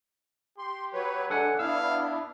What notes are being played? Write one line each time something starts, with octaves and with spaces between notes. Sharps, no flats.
G4 C6
F#3 B4 C#5
F#3 G#3 D4 A4 F#5 G#5
B3 D4 E4 F5 E6